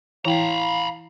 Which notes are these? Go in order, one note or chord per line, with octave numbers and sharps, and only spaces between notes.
E3 E4 F5 G5 A#5 B5